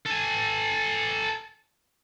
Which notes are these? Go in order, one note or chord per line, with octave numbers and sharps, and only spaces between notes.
A4 G#5